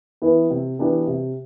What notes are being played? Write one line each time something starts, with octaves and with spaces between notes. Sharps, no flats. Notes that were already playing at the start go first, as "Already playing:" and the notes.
E3 B3 E4 B4
C3
E3 B3 D4 G4
C3